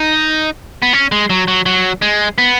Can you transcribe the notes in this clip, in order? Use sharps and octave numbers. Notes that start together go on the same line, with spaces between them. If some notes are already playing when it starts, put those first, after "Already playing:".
Already playing: D#4
B3
C#4
G#3
F#3
F#3
F#3
G#3
B3